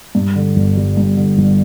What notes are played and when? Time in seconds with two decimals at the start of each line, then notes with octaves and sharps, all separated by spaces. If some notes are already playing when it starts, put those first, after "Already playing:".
0.15 G2
0.36 D3
0.56 G1
0.77 G3
0.97 G2
1.17 D3
1.38 G1